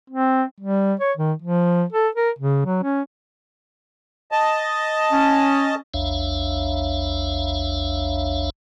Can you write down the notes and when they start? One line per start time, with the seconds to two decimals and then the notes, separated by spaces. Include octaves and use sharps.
0.10 C4
0.60 G3
1.00 C#5
1.17 D#3
1.42 F3
1.93 A4
2.15 A#4
2.39 C#3
2.66 F#3
2.83 C#4
4.32 D#5 A5
5.11 C#4
5.94 A#1 E2 D4 C#5 E5 F5